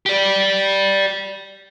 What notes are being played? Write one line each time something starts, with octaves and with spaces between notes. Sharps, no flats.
G4 D5